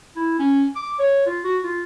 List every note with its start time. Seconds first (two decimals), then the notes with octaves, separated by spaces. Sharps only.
0.16 E4
0.39 C#4
0.76 D6
1.00 C#5
1.26 F4
1.44 F#4
1.64 F4